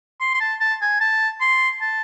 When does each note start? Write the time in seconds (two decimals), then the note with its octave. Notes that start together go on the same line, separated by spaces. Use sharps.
0.20 C6
0.34 C6
0.40 A5
0.60 A5
0.82 G#5
1.01 A5
1.41 C6
1.81 A5